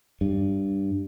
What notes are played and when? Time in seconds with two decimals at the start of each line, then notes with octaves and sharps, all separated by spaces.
0.21 G2